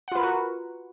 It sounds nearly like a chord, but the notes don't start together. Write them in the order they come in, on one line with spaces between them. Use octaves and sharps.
F#5 F4 B4 A#4 F#4